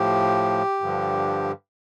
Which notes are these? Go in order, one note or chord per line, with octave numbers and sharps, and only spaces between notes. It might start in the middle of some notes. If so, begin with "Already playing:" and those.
Already playing: A2 F3 G4
G2 D3 F3